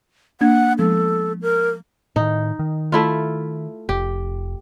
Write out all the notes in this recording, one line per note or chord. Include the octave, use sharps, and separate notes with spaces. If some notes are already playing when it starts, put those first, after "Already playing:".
A#3 D4 F#5 G#6
F3 G#3 B3 A4
A#4
A2 D#3 D#4
D#3
A3 E4 F4
F1 G4